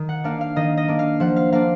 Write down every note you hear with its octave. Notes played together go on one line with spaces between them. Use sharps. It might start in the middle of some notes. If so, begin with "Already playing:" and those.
Already playing: D#3
F#5
A#3 D4 F5
F5
D#3 D#5
D#5
A#3 D4
F5
F3 F#5
F5
A#3 D4 F5